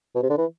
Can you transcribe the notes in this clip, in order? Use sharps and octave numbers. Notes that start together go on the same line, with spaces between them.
B2
C3
D3
E3